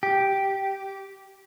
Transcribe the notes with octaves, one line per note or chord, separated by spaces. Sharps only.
G4